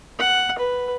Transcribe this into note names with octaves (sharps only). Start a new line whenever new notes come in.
F#5
B4